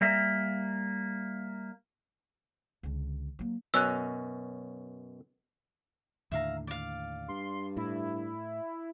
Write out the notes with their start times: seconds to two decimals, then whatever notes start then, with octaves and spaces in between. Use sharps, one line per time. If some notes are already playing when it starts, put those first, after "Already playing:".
0.01 G3 A#3 E5
2.83 C#2 D3
3.39 F#3 A#3
3.74 F#2 B2 C#4 E6 F#6
6.32 D#2 A2 D3 E5 F5 A#5
6.67 D5 F5
7.28 G2 C6
7.77 A2 E4